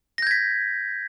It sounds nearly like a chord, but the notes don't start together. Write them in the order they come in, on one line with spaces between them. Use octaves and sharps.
A#6 G6 G#6 B6